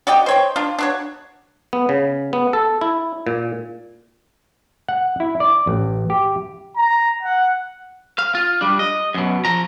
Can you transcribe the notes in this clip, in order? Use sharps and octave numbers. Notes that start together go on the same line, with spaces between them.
F#4 D5 D#5 G5
C5 C#5 G5
D4 F4
D4 F#4 C#5
B3
C#3
B3
A4
E4
A#2
F#5
E4
D5
A1
G4
A#5
F#5
F5
F4
G3 D4
D#5
F#2 B2
F3 A#5